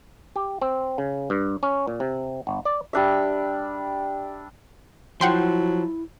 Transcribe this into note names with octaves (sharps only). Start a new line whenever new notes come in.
G4
C4
C#3
G2
C#4
A#2
C3
G1
D5
G3 D4 E5
F3 F#3 E4 F#5 G5 C6